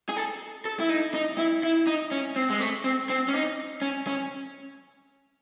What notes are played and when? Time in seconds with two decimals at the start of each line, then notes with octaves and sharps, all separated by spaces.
0.09 G#4
0.16 A4
0.65 A4
0.80 E4
0.89 D#4
1.14 D#4
1.38 E4
1.63 E4
1.87 D#4
2.12 C#4
2.36 C4
2.50 G#3
2.60 A3
2.84 C4
3.10 C4
3.28 C#4
3.34 D#4
3.82 C#4
4.07 C#4